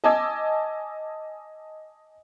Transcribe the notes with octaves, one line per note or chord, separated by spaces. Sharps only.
D#5 G#5 A5 D6 E6 G#6